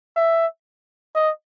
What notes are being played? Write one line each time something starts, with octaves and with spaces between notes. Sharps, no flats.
E5
D#5